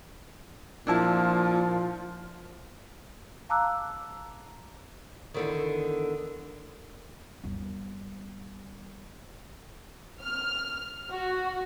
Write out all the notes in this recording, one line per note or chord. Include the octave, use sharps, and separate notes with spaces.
A#2 F3 D4 E4 F4 A5
F5 A5 A#5 D6 E6 F#6
E2 D3 D#3
G1 D#2
F6
F#4